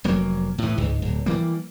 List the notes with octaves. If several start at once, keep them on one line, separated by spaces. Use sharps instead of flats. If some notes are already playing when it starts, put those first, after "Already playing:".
F1 F#3 A#3
A2 E3
C#2 G#2
D1
E3 G3 A#3